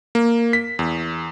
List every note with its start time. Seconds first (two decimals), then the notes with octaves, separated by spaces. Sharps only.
0.15 A#3
0.53 B6
0.79 E2